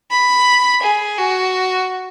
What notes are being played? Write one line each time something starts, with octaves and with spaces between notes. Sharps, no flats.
B5
G#4
F#4